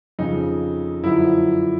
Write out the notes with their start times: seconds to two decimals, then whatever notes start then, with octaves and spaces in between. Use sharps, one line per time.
0.19 F2 C#3 F3 D#4
1.03 F#2 D3 F3 E4